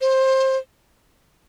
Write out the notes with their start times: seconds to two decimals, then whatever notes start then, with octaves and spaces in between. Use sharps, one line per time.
0.01 C5